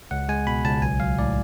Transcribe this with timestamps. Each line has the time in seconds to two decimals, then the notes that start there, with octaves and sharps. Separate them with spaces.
0.11 C#2 F#5
0.29 G#3 G#5
0.47 B2 B5
0.64 C#2 A5
0.82 B1 G#5
1.00 F#3 F5
1.18 A2 D5